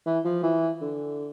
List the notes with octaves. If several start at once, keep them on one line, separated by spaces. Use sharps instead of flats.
E3
F3
E3
D3